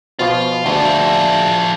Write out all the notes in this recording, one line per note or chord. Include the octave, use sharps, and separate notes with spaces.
B2 F3 F4 F5
D2 F3 G#4